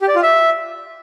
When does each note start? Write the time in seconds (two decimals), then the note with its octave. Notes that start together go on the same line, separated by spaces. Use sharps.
0.01 G4
0.08 D5
0.16 F4
0.23 E5